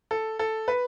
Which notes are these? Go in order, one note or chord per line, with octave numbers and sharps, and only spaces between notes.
A4
A4
B4